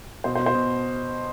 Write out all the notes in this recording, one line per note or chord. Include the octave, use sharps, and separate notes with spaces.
B2 C5
C5
B2
C5
B2